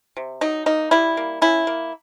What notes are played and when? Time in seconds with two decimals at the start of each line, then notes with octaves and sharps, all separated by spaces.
0.17 C3
0.41 F#3 D#4
0.66 A#3 D#4
0.91 G3 E4
1.17 A#3
1.42 C#4 E4
1.67 A#3